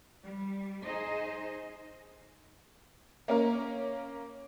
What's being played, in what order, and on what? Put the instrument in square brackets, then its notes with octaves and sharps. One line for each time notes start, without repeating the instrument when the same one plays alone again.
[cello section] G3
D#4 G#4 C5 D#5
[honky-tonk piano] A#3 C#4 A#4